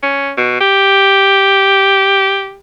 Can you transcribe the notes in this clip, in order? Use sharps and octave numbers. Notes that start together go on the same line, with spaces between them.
C#4
B2
G4